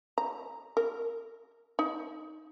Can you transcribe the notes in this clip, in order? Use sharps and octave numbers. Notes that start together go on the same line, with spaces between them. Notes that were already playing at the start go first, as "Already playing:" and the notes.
A#5
A#4
D#4